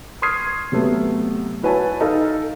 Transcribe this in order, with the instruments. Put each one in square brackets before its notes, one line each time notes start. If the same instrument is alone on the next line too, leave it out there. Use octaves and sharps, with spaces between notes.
[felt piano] C6 C#6 D#6 F6 G#6 C7
C3 F#3 A3 B3
E4 F#4 B4 C#5 G#5 A5
D#4 A4 F5